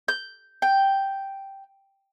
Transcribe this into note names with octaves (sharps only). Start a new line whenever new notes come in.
G6
G5